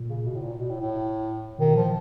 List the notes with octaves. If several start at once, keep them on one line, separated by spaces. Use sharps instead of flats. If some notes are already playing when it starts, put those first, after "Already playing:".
Already playing: A#2
C#3
B2
A2
A#2
B2
A2
A2
B2 D#3
A#2 F3